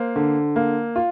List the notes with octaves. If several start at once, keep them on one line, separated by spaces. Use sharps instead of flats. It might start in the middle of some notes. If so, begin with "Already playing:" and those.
Already playing: A#3 C5
D3
A#3
F4